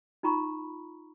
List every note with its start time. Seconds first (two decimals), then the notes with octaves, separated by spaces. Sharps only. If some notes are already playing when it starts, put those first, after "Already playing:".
0.23 D#4 F4 A#5 B5 C#6